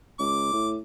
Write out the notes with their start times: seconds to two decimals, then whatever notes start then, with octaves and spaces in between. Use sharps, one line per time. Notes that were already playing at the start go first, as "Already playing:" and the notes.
0.19 C#2 D6
0.53 A2